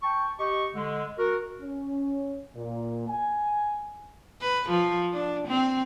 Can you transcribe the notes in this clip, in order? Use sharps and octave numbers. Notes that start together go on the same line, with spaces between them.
G5 A5 C#6
G4 D#5 C#6
D3 G#3
F#4 A#4
C#4
A#2
G#5
B4
F3
D4
C4